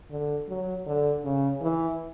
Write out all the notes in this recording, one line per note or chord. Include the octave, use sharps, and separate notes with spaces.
D3
F#3
D3
C#3
E3